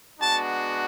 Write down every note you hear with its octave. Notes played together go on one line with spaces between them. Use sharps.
G#3 B3 D4 F#4 A5